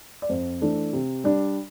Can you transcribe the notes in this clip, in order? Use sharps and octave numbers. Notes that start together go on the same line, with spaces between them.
D5
F2 C5
E3 A3 D4
C3
G3 D4